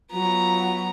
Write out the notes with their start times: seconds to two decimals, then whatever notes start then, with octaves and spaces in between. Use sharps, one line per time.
0.12 F#3 B3 F4 A#5